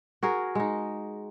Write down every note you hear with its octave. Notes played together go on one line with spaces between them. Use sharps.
F#4 G#4 A#4
G#3 D#4